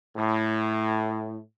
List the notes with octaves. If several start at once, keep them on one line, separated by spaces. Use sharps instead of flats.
A2